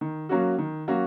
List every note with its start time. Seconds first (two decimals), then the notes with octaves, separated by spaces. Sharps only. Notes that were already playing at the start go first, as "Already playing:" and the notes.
0.01 D#3
0.29 F#3 A#3 C#4 F#4
0.58 D#3
0.88 F#3 A#3 C#4 F#4